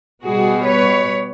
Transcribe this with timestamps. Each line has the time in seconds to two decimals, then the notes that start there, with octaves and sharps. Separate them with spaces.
0.24 B2 G3 B3 F#4 G#4
0.66 B4 C#5